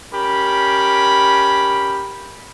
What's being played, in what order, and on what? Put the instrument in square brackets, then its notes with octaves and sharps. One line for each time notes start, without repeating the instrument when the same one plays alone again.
[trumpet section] C#4 G4 A#4 B5